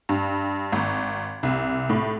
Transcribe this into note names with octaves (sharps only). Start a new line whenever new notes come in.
G2
G#1
C2
A2